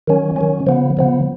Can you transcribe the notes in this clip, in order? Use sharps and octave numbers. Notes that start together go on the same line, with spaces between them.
D#3 F#3 C#4
D#3 F#3 C#4
C#3 F3 B3
C#3 F3 B3